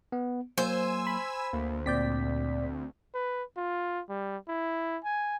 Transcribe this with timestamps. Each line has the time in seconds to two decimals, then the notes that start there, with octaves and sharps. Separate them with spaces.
0.12 B3
0.58 F#3 A#3 C5 G#5 E6
1.07 B5
1.53 D2 A#3
1.86 A#2 C4 D5 G6 B6
3.15 B4
3.57 F4
4.09 G3
4.48 E4
5.04 G#5